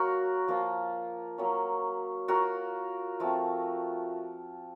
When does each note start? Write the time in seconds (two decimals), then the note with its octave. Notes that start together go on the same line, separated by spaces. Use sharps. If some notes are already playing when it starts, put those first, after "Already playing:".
Already playing: F#3 A#3 F#4 A#4
0.48 F3 A#3 F4
1.38 F#3 A#3 C#4
2.28 A#3 F4 F#4 A#4
3.20 F3 A3 C4